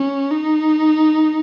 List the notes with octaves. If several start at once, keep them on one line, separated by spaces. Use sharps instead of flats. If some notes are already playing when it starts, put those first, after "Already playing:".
Already playing: C#4
D#4